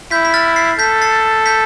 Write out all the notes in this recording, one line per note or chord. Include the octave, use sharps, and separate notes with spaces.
E4 G6 B6
B6
F6 A6
A6 C7
A4 G6 B6
A6 C7
G6 B6